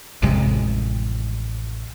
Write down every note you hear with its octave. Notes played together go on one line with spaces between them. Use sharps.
A1 F2 C3 G#3